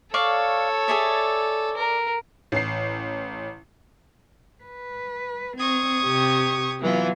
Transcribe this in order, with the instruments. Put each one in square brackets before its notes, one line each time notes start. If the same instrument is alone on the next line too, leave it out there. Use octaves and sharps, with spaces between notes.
[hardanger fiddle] A4 C#5 [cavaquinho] D5 F5 C#6
[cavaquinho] G#4 D5 E5
[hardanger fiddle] A#4
[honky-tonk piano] A1 C7
[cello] B4
[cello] C4 [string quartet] C#6 D#6 G#6
[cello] C3 G4
[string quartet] E3 F4 [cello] F#3 B3